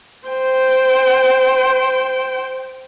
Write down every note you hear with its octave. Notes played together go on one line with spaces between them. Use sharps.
C5 G5